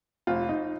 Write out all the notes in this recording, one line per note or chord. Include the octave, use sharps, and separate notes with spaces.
F1 F4
D#4